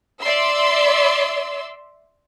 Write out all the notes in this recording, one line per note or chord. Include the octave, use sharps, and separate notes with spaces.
D5 E5 C6 E6